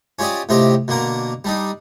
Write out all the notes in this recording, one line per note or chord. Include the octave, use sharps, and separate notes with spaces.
C#4 F4 G4 D5 D#5
A2 C3 C4 F4 G4 D#5
B2 D3 A#3 A#4
G3 D4 D#4